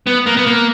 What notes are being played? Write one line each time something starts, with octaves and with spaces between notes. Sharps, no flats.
B3
A#3
B3
A#3